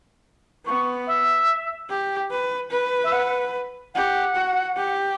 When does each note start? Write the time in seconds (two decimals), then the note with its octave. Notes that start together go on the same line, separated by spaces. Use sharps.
0.66 B3 C#6
1.07 E5
1.90 G4
2.31 B4
2.71 B4
3.04 E5
3.12 F#5
3.94 G4 F#5
4.36 F#4
4.76 G4